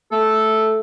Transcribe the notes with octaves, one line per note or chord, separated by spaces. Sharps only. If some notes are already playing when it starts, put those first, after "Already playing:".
A3 A4